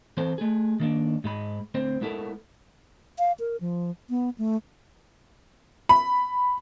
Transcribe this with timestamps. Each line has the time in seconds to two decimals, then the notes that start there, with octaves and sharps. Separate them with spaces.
0.17 E3 C4 A4 C5
0.38 A3 G#4
0.80 D#3 A#3 D4
1.24 G#2 G#3 B5
1.74 D2 C4 C5
2.01 G#3 B3 E4 A4 A#4
3.19 F5
3.40 A#4
3.61 F3
4.09 B3
4.38 A3
5.89 B5